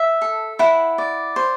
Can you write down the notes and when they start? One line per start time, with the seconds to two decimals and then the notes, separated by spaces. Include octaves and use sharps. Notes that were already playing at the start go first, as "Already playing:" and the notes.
Already playing: E5
0.22 A4
0.59 E4 F#5
0.98 D5
1.36 C5